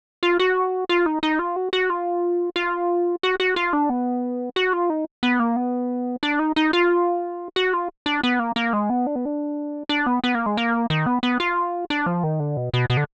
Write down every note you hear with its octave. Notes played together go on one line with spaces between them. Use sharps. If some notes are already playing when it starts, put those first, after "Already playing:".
F4
F#4
F4
D#4
D#4
F4
F#4
F#4
F4
F4
F#4
F#4
F4
D4
B3
F#4
F4
D#4
B3
A#3
B3
D4
D#4
D#4
F4
F#4
F4
D4
B3
A#3
A#3
G#3
B3
D4
B3
D4
D4
B3
B3
A#3
G#3
A#3
D#3
B3
B3
F4
D4
F3
D#3
D3
B2
B2
B2
D3